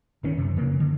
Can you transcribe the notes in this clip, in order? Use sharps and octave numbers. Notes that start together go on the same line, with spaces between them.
G1 D#3 C#4
F#2 C3
C#3 E3 A#3
D3